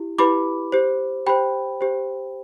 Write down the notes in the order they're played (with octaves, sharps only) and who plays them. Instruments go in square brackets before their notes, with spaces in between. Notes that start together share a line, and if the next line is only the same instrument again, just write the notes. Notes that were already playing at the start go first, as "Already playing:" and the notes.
Already playing: [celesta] E4 G4
E4 G4 B4 B5 D6
G4 C5
G4 C5 G5 B5
G4 C5